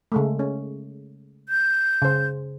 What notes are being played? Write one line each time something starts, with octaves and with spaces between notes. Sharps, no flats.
C#3 G#3 A3
C#4
G6
C#3 C5